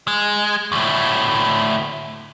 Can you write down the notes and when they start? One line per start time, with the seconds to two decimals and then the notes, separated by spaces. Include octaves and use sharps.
0.08 G#3
0.72 D2 A2